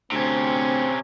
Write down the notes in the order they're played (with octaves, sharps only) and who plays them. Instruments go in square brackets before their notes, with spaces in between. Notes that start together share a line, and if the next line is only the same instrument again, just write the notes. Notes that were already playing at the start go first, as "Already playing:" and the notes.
[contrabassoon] D2 [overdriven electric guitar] C3 C#4 [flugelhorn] C4